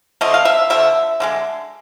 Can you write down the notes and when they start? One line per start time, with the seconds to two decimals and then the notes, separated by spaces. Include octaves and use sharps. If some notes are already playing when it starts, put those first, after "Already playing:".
0.21 D3 F3 A3 D#5
0.34 F5
0.45 E5
0.70 D3 F3 A3 E5
1.20 D3 F3 G#3